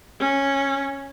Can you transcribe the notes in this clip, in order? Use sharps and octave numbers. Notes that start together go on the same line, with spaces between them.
C#4